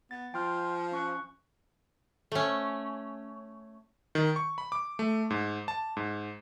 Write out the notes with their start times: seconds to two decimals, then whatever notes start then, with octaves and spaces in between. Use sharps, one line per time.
0.11 B3 A6
0.34 F3 G5 C6 F6
0.92 C#4 C#6 F#6
2.32 A3 C#4
4.15 D#3
4.36 C#6
4.58 B5
4.72 D6
4.99 A3
5.30 G#2
5.68 A5
5.97 G#2